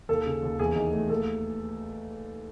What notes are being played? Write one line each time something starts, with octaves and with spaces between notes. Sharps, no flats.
D#2 A4
C#3
D#2
E2 G#4
D#3
A3
D#2 A4